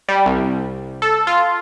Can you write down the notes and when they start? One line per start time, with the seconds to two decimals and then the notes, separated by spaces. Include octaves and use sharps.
0.08 G3
0.26 C2
1.02 A4
1.27 F4